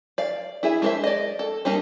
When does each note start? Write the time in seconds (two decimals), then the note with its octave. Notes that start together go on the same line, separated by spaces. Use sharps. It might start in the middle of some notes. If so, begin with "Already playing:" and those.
0.18 D5 F5
0.63 E4 G#4 E5
0.82 G#3 D4 A#4 C5 E5
1.04 D5 D#5
1.39 A4
1.65 G3 A#3 D4 D#4 A#5